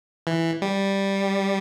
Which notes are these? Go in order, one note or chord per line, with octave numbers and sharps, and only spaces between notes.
E3
G3